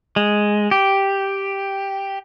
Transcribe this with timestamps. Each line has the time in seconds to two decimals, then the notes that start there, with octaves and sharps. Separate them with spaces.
0.16 G#3
0.71 G4